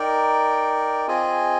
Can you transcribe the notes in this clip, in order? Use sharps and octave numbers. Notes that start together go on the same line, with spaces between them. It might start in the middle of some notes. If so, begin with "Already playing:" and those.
Already playing: D#4 A#4 D5 G5
C4 F4 G#4 D#5 G#5